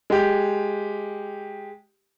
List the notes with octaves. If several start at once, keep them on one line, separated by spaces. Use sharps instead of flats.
G#3 G4